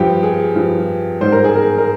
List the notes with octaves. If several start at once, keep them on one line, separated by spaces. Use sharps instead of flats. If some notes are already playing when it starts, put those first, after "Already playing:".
Already playing: G2 F3 G4
G#4
G2 F3
G#2 G3 C5
A#4
G#4
A#4
A#4